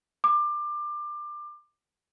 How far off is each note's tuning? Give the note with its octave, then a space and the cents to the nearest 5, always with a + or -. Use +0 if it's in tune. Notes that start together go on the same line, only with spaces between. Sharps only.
D6 +25